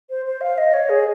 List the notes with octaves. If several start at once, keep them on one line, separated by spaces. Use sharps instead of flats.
C5
C5
F5
D#5
C#5
G#4